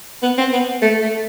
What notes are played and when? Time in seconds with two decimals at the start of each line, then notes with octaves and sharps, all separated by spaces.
0.23 B3
0.38 C4
0.53 B3
0.82 A3
1.02 A3